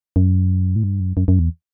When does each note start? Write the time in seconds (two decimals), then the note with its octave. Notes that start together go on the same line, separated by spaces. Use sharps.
0.16 F#2
0.76 A2
0.84 G2
1.00 F#2
1.17 F#2
1.28 F#2
1.39 E2